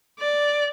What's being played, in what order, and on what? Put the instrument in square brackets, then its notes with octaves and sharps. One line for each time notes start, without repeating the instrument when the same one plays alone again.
[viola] D5